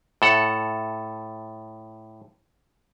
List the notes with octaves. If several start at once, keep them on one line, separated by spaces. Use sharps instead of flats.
A2 A4 F#5